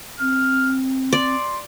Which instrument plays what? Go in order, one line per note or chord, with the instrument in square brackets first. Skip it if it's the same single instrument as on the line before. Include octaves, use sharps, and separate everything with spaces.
[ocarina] C4 [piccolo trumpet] F6
[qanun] D5 [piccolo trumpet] C6